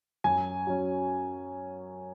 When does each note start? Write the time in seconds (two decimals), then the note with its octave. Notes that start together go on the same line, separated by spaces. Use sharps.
0.24 F#2 G#5
0.67 F#3 C#4